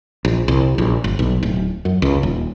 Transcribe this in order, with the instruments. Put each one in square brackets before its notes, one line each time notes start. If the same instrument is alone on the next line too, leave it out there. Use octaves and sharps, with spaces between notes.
[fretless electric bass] A#1
C2
A#1
G1
B1
D1
F#2
C#2
D#1